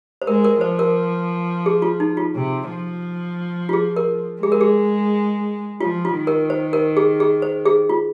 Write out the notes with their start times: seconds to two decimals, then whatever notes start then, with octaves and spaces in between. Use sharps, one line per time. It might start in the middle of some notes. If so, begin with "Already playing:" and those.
0.22 C5
0.27 G#3 A#4
0.44 A#4
0.61 F3 C5
0.79 A#4
1.66 G#4
1.82 F4
2.00 D#4
2.17 F4
2.35 C3
2.70 F3
3.69 F4
3.73 G#4
3.96 A#4
4.42 G#3 G#4
4.52 A#4
4.61 G#4
5.81 F3 F4
6.05 F4
6.16 D#3
6.27 A#4
6.50 C5
6.73 A#4
6.97 G#4
7.20 G#4
7.42 C5
7.66 G#4
7.89 F4